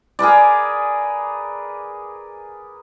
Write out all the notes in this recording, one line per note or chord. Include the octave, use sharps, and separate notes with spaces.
G#4 A#4 B4 D5